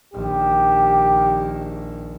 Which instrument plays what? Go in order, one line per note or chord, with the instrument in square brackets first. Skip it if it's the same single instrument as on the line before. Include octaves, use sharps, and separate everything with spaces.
[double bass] A#1 D#3 [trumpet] G4